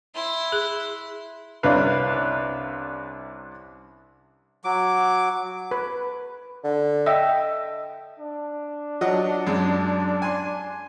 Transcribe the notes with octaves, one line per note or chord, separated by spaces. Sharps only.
E4 C6
G#4
C2 C3 C#4 D4 B4 F5
F#3 D6
B4
D3
D#5 E5 G5
D4
F#3 D#5 F#5
F#2 G#3
G#5 C6